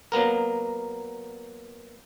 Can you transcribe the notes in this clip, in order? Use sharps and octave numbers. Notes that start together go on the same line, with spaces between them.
F#3 A#3 B3 A#4